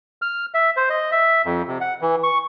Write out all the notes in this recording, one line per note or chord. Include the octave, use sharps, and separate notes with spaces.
F6
E5
C5
D#5
E5
F2
C3
F#5
E3
C#6